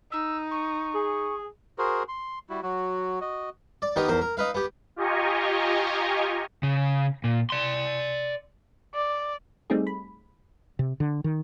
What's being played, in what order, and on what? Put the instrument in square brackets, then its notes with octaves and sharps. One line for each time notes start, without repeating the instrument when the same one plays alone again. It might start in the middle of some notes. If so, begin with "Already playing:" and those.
[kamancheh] D#4 [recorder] E6
[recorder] C#6
[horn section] G#4
[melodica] F#4 G#4 A#4 C5
C6
G3 E4 F#4
F#3 F#4
F#4 D#5
[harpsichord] D5
D#3 B3 D#4 G4 A#4 B4
E2 A#4 C5
A#4
D#4 B4 F5
B3 G4
[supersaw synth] F4 G4 D#5 G#5 A#5 C#6
[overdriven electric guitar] C#3
A#2
D5 C6
[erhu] D5
[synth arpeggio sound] G3 A3 C4 D#4 G#4
B5
[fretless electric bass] C3
D3
D#3